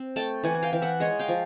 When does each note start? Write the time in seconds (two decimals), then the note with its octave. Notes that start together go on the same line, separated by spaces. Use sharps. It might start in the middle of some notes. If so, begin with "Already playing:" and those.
Already playing: C4
0.16 A3 G5 A5
0.44 E3 F#5 G#5
0.55 G#5
0.63 F5 G5
0.73 E3
0.82 E5 F#5
1.00 G#3 C#5 D#5
1.19 F5 G5
1.28 F3